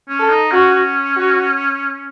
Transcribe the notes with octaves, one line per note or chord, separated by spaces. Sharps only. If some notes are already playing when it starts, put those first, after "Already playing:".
C#4
A4
D#4
C#4 F#4
F#4